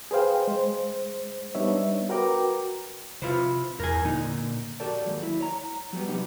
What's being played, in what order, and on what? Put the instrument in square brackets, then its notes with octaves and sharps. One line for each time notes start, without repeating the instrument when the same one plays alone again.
[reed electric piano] G#4 B4 C5 F5 G5
G#3 C5
G3 B3 D4 D#4 C#5 E5
F#4 A#4 B4 G5 A#5 D6
[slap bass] C3 [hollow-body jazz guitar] F4 B4 C5
[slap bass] E2 [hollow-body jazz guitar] A#4 G#5
[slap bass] A#2 D3 [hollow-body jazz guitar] D#4
[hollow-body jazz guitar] F#4 G4 A4 A#4 D5
D#2 G#2 F#3
E4
C#5 A#5
F#3 G3 B3
C3 G3 B3 D#4 G4